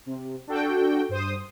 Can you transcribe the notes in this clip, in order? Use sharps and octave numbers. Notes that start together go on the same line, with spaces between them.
C3
D4 F#4 A4 G5
G2 C5 D#6